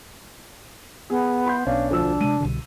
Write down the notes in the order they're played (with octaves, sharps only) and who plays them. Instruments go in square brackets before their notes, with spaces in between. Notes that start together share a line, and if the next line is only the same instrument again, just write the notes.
[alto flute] B3 [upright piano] G#4
[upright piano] B5 C6 G6
[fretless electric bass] B1 [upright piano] B3 C#4 D4 [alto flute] F5
[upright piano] D2 F3 E6 [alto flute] D4
[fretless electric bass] C3 G#3 [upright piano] D#7
[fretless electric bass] C2 B2 D3